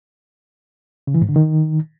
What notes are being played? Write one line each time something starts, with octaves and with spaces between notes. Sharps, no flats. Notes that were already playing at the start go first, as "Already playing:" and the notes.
C#3
E3
G#2
D3
D#3